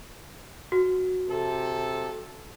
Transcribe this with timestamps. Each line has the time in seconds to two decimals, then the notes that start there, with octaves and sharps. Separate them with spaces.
0.72 F#4
1.29 C3 A4